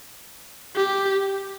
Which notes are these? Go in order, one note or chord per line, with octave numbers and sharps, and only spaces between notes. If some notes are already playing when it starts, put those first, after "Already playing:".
G4